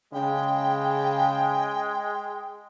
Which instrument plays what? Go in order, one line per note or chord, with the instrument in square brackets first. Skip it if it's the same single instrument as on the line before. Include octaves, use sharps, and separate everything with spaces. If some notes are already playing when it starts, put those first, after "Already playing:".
[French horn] C#3 [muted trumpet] G#3 [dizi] G5 [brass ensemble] G#5